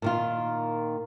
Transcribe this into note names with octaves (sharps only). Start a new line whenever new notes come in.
A#2 D#3 F4